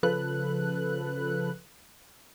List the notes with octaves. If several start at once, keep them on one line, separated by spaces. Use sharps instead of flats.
C#3 F3 A4 B4 F#6